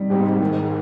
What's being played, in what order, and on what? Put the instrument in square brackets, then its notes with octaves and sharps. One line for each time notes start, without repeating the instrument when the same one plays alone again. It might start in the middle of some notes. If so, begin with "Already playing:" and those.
Already playing: [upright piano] G3 C4 D#4
[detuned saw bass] G#2 [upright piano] C4 D#4 G4
[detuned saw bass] G#2 [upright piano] D#3